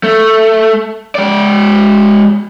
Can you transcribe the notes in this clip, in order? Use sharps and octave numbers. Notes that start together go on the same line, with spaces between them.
A3
G#3 D5